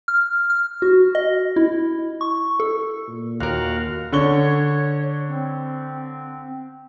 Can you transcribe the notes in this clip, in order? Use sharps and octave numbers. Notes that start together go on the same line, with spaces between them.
F6
F6
F#4
D#5
E4
C#6
A4
A#2
D#2 F#4 A#4 F5
D3 C#5 C#6 G7
C4